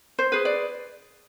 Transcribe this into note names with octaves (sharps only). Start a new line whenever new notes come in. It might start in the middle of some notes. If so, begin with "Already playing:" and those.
C5
G#4 B4
D5